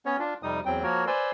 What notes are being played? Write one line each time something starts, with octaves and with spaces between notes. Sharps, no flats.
B3 C#4 C#5
D4 F4
F2 C3 G3 D#4 D#6
E2 F#3 C4 G5
F3 A#3 F#4 A#4 C#5
B4 C5 D5 G#5 C6 E6